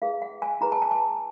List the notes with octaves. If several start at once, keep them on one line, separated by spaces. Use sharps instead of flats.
E4 G#4 B4 F5
F#5
G#5
E4 G#4 B4 A#5
A5
G#5
A5